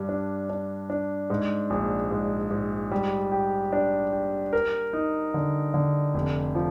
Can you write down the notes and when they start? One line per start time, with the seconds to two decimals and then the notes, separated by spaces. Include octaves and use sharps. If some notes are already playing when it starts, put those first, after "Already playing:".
Already playing: G2
0.09 D4
0.50 D4
0.90 D4
1.30 G#2
1.70 A#1
2.11 G#2
2.51 G#2
2.91 G3
3.32 G4
3.73 D4
4.13 G4
4.53 A#4
4.93 D#4
5.34 D3
5.74 D3
6.14 F1
6.55 F3